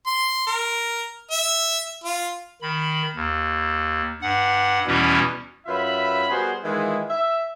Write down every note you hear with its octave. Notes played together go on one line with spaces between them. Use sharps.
C6
A#4
E5
F4
D#3 B5
D#2
G2 F#5
E2 B2 E3 G3 C#4 E4
F#2 F4 B4 E5 B5
G3 B3 F#4 G#4 A#4 C5
D#3 E3 G#3 E4 F4 G#4
E5